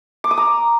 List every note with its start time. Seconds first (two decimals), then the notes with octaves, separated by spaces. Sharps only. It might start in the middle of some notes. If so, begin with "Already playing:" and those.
0.24 D6
0.31 D#6
0.38 A#5